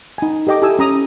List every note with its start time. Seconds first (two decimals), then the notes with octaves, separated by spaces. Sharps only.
0.18 D#4 G#5
0.47 G4 A4 D#5 G5 D6
0.62 E4 G4 A4 G#5 D#6 E6
0.79 C#4 A#5 D#6